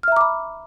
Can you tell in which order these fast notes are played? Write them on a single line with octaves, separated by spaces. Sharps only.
F6 E5 A#5 D6 B5